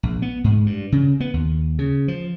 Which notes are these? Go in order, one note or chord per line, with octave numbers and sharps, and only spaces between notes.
A#1
B3
G#2
G2
C#3
B3
D#2
C#3
F3